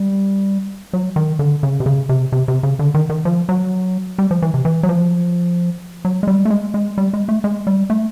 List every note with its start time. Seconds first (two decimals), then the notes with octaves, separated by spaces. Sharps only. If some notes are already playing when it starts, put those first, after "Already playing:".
Already playing: G3
0.93 F#3
1.16 D#3
1.39 D3
1.63 C#3
1.80 C3
1.86 C#3
2.09 C3
2.32 C3
2.48 C3
2.63 C#3
2.79 D3
2.94 D#3
3.09 D#3
3.25 F3
3.49 F#3
4.18 G3
4.31 F3
4.42 E3
4.54 C3
4.65 E3
4.83 F#3
4.89 F3
6.05 F#3
6.23 G#3
6.27 G3
6.45 A3
6.50 G#3
6.74 G#3
6.98 G3
7.13 G#3
7.28 A3
7.44 G#3
7.67 G3
7.90 A3